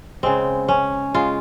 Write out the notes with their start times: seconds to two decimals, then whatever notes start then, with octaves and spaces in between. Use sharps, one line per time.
0.23 C#3 G#3 C4
0.68 C#4
1.14 C#3 G#3 F4